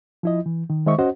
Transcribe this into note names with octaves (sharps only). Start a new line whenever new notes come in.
F3 E4 D#5
E3
D#3
D#3 G#3 C5 D#5 E5 C#6
C#4 F#4 C5 D#5 F#5